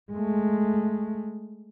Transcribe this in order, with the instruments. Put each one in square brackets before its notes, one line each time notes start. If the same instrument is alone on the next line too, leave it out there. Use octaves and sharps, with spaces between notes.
[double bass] G#3 A3